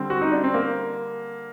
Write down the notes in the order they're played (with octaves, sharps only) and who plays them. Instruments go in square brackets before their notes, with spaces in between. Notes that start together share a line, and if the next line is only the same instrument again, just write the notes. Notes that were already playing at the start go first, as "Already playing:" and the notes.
Already playing: [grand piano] D3 G3 C4
F#4
D#4
D4
C4
A#3